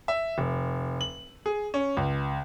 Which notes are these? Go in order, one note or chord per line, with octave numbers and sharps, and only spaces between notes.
E5
F1
F#7
G#4
C#4
C#2